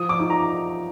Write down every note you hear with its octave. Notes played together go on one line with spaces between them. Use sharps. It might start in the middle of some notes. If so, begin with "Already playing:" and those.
Already playing: F3 D#6
D6
D#4
A#5